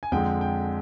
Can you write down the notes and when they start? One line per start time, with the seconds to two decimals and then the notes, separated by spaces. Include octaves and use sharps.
0.03 G#5
0.12 F2 D3 G#3 G5
0.41 G5